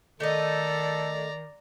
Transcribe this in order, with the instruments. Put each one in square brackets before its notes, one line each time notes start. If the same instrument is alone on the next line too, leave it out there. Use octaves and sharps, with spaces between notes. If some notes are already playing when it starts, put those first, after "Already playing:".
[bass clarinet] D#3 [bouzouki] A3 D#5 [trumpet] A4 [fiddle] D5 A#5